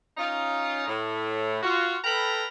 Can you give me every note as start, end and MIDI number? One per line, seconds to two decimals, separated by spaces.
0.18 0.87 61
0.18 0.87 63
0.18 0.87 65
0.88 1.58 45
1.63 1.96 65
1.63 1.96 66
2.03 2.45 69
2.03 2.45 71
2.03 2.45 77
2.03 2.45 79
2.03 2.45 82
2.03 2.45 83